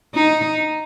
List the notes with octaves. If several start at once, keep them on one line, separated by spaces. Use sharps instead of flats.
D#4